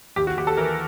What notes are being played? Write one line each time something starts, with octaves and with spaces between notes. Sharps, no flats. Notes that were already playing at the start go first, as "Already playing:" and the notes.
D#2 G4
F#4
D#2 G4
A4
E3 A#4